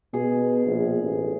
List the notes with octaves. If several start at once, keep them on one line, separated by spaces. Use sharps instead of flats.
B2 G#4
A#1
A1